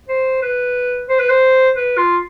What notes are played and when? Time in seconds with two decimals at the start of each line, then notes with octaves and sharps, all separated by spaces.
0.09 C5
0.42 B4
1.09 C5
1.20 B4
1.29 C5
1.75 B4
1.97 F4